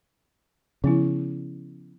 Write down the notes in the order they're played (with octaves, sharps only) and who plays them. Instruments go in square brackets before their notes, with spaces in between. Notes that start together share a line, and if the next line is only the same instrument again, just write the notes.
[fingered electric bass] C#3 [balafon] F3 B3 E4